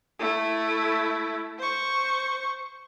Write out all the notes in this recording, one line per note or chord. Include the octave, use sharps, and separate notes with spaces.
A3 E4
C5 C#6